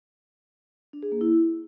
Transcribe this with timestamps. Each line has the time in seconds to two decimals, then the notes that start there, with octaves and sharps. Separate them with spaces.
0.93 D4
1.03 G#4
1.12 A#3
1.21 E4